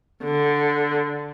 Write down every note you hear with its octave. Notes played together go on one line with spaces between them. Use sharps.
D3